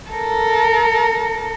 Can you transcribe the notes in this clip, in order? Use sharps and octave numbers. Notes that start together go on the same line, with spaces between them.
A4 A#4